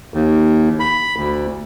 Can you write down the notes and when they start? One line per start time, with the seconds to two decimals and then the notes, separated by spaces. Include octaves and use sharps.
0.14 D#2
0.80 B5
1.16 D2